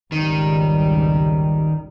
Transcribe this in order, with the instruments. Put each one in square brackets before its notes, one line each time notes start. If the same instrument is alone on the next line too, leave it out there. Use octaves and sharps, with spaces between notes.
[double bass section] G#1 C#2 G3 [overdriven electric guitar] D#3